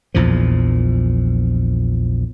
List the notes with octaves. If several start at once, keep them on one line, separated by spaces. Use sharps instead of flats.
A#1 E2 A#2 F3